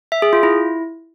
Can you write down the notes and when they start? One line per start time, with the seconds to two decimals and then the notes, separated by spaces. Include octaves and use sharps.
0.12 E5
0.22 G#4
0.33 F4
0.43 E4